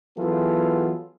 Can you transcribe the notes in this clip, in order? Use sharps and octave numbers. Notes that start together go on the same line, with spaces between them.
E3 F#3 B3 F4 G#4 A4